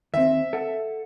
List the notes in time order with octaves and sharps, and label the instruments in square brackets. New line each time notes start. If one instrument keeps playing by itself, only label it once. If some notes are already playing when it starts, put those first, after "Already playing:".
[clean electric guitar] D#2 C4 [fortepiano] E5
[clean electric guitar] A4 F#5